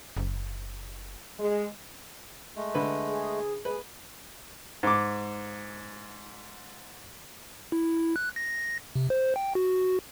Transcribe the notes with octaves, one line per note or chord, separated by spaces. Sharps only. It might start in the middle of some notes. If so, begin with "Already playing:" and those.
F#1
G#3
G#3 A3
D3 B4
G#4
G#4 B4
G#2 D6
E4
F#6
A#6
C3
C5
G5
F#4